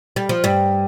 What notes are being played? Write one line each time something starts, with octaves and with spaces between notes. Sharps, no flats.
G3
F3
G2 G3